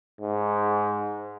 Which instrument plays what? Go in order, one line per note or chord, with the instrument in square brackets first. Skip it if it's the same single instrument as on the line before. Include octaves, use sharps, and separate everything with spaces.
[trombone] G#2